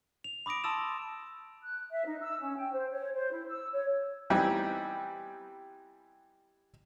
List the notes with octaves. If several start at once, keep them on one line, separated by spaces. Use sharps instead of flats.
F7
B5 D6 D#6 A#6 D7
A5 C6 D#6 E6 A6 E7
F#6
E5
D#4
E6
C#4
G5
C5
C#5
C5
E4
E6
C#5
E3 G3 B3 C4 D#4